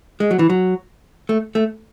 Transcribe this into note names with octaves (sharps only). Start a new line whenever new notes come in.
G#3
F#3
E3
F#3
A3
A3